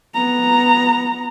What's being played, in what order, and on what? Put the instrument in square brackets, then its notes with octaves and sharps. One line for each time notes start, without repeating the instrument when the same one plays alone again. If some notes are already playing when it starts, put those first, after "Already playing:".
[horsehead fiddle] B3 A#5